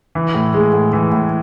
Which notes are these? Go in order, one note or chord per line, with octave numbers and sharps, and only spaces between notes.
E3
A2
G#3
A2
E3
A2